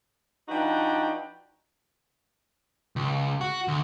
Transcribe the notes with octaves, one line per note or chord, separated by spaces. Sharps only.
F3 D4 D#4 F#4 B4 G5
C#2
F#4
D2